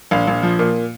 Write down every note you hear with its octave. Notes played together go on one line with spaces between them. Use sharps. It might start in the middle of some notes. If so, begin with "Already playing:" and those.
A#1 F5
A#1
F3
A#2